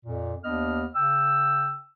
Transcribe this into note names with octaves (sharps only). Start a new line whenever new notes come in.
F2 A#2
D#2 B3 D4 D#5 F6
C#3 G5 E6